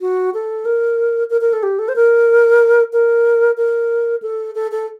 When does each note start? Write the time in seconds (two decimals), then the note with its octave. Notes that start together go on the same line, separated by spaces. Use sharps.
0.01 F#4
0.34 A4
0.65 A#4
1.30 A#4
1.41 A#4
1.53 A4
1.63 G4
1.79 A4
1.89 C5
1.96 A#4
2.93 A#4
3.57 A#4
4.22 A4
4.55 A4
4.71 A4